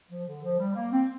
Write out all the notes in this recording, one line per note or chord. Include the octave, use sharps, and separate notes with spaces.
F3
D3
F3
G3
A#3
C4